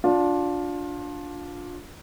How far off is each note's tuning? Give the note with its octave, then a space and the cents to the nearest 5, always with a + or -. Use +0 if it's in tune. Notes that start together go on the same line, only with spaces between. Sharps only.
D4 -10 F4 +25